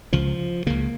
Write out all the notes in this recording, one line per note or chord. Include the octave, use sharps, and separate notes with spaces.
C#2 C#3 F3
C#2 C#3 A#3